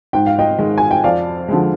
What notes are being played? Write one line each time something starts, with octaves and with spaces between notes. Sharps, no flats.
G#2 G5
F5
D#5 G5
D#3 G#3
G#5
G5
F2 D5 F5
D3 F3 G#3